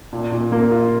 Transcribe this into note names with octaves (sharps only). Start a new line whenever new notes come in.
A#2
A#2
A#3
F4